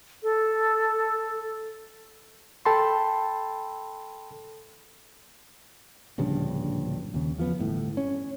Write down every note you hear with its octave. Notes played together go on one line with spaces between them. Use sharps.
A4
A4 G5 A5 B5 C6
D1 A#1 G2 C#3
D#2 C#3
E2 F3 B3
G1 A2
C#4